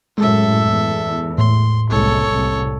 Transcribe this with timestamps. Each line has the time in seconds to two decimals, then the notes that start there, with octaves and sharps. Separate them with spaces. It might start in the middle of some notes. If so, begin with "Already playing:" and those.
0.18 F#2 A2 G#3 A4 E5
0.68 E2
1.38 A2 C6
1.90 F#1 C2 G#3 A4 C#5
2.32 C2